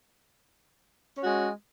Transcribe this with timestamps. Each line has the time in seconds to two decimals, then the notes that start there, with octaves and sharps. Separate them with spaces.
1.16 C#4
1.20 F#4
1.24 G#3